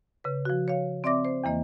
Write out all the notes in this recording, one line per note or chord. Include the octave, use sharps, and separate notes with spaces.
C#3 B4
F3 F#4
C#5 F5
C4 D5 E5 D6 A#6
C5
E2 E3 A#3 D#5